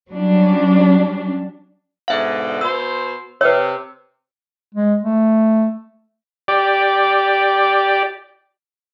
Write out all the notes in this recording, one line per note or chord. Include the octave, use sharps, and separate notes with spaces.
F#3 G3 C#4 D4
G#2 B2 D3 E5 F5
B2 C5 E6
C3 B4 C#5 E6
G#3
A3
G4 D5